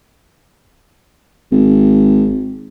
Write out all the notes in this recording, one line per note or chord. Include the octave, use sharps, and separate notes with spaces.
G#1